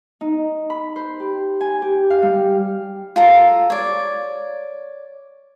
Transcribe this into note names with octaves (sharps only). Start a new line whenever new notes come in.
D#4
B5
C5
G4
G#5
G4
F5
G3
F4 A4 A#5
C#5 D5